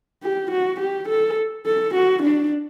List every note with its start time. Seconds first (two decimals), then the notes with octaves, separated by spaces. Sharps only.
0.23 G4
0.51 F#4
0.80 G4
1.08 A4
1.66 A4
1.94 F#4
2.22 D4